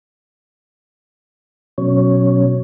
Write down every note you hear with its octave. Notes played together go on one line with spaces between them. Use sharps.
B2 F#3 C#4 C#5